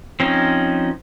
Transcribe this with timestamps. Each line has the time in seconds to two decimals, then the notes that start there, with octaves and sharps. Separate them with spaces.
0.20 F3 C4 C#4 D#4